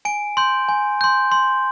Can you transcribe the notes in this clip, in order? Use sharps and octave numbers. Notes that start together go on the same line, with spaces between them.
G#5 D7
C6 G6
G#5
C6 G6
C6